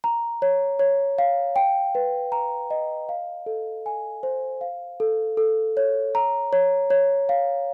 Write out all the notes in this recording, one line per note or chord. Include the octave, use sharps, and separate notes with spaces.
A#5
C#5
C#5
F5
G5
B4
A#5
D#5
F5
A4
G#5
C5
F5
A4
A4
C#5
A#5
C#5
C#5
F5